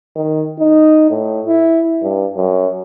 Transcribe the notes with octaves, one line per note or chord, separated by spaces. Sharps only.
D#3
D#4
A2
E4
G2
F#2